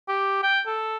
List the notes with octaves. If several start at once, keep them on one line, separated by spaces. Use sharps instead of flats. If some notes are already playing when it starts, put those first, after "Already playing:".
G4
G5
A4